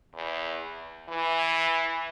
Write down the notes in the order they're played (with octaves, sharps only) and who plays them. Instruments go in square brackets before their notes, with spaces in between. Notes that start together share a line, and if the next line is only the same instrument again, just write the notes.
[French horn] E2
E3